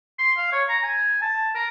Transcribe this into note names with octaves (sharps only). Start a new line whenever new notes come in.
C6
F5
C#5
A#5
G#5
A5
A#4